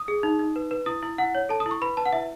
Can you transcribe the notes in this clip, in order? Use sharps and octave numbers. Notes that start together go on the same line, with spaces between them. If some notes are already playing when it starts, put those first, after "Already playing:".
Already playing: D#6
G#4
D#4
D#4
B4
B4
E4 D#6
E4
E4 F#5
C#5
A4 A5
D#6
E4
C#6
B4 B5
B4 A5
F#5
E4 E5